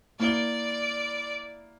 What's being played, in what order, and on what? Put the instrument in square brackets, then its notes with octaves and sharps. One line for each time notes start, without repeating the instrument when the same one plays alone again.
[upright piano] A#3 E4 G7 [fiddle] D5